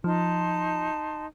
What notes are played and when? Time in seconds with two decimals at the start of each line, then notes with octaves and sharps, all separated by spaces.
0.04 F3 D#4 A5 C6